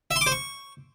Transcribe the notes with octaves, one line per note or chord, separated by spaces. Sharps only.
E5
C6
D6
C5
C#6